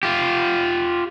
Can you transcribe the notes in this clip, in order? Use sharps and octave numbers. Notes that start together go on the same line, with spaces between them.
F4 G4